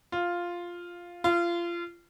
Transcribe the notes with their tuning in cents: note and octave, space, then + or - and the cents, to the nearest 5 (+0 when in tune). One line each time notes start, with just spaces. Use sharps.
F4 +0
F4 -25